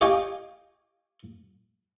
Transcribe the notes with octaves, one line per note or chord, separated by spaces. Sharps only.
G4 C#5 D#5 F5 G5 G#5